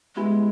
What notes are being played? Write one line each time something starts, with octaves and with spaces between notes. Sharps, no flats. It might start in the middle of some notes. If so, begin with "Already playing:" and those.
G3 G#3 B3 E4 G#4